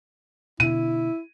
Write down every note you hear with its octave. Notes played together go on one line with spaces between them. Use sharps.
B2 D3 E4 D#7